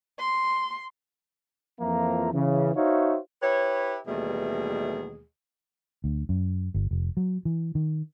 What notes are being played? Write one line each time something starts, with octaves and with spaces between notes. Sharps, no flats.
C6
F2 E3 F3 A#3 E5 A#5
C#3 E3
D#4 F#4 C5 C#5 E5 F5
E4 G4 B4 C#5
D#2 B2 E3 G3 A3 G#4
D2
F#2
G1
F1
F#3
E3
D#3